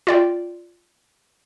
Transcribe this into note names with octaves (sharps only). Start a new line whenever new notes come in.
F4 D5 G5